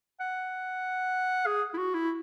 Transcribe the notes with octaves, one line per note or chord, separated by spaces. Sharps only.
F#5
G#4
E4
F#4
E4